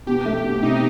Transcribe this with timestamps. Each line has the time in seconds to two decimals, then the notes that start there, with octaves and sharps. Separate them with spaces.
0.07 B2 G4
0.25 A3
0.44 B2
0.62 C3 D#4